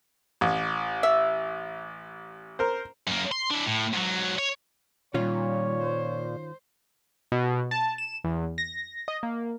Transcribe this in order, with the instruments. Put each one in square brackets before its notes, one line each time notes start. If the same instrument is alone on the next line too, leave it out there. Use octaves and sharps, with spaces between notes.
[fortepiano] A1
[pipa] E5
[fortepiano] A#4 C5
[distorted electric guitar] F#2 A#3
C6
D4 E4
A2
G#2 F#3
C#5
[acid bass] A#2 [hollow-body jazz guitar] D#3 C#4 F4 [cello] G3 [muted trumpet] C#5
[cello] C5
[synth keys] B2
A5
E7
E2
A#6
D#5
A#3